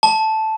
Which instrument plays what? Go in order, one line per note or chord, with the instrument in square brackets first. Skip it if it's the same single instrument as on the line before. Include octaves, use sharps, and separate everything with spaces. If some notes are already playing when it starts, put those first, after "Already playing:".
[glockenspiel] A5